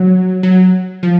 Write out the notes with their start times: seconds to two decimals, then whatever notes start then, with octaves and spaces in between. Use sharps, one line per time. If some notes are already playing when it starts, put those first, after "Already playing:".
Already playing: F#3
0.43 F#3
1.03 F3